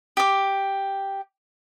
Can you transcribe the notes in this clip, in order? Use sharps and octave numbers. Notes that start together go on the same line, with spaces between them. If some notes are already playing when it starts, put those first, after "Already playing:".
G4 D6